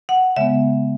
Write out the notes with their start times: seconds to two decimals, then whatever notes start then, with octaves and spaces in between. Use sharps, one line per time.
0.09 F#5
0.36 C#3 G#3 B3 E5